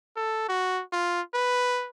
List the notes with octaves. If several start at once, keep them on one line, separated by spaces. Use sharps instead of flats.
A4
F#4
F4
B4